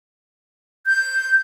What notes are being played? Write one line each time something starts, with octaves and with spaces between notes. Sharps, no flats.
G6